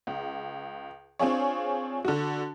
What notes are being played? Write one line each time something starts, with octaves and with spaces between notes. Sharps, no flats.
C#2
C4 D4 F4 G#4 C#5
D3 F#4